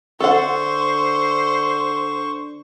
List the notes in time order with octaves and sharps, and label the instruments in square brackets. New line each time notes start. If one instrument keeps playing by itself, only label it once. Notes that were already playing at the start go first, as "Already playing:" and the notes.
[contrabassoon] D3 [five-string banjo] A4 F#5 [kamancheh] C5 [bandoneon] C#6